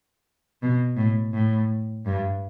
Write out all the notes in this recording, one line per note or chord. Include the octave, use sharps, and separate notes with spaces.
B2
A2
A2
G2